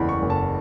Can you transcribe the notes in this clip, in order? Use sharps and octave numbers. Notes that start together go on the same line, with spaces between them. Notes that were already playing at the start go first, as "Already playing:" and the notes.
Already playing: F#1 E2 B5
C#6
F#1
A5